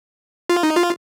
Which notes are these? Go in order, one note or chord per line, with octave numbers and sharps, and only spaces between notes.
F4
D#4
F4